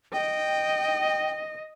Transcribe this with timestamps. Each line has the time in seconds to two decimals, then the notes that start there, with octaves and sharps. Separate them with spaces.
0.13 D#5 G5